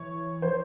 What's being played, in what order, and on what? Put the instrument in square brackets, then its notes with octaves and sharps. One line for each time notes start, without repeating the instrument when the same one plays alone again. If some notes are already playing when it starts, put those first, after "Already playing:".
Already playing: [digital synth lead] E3 [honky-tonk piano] C#5
[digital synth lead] F3 [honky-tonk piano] C5